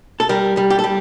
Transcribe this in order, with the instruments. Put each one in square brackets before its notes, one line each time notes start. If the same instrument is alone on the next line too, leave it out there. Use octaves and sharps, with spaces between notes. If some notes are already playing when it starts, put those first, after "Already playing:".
[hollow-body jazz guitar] A4
G3 A#4
G3
G4
A4
G3